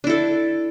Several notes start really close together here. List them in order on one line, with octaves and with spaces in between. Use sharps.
D4 E4 A4